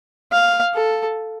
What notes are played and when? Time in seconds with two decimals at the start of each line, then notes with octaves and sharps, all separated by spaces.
0.32 F5
0.74 A4